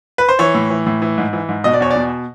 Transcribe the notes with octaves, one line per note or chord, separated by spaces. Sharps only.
B4
C5
E3 C#5
A2
E3
A2
E3
G#2
E3
G#2
B2 D#5
D5
E2 C#5
B2 D5